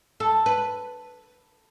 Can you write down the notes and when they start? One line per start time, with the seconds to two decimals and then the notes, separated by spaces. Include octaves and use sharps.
0.20 A4
0.46 B4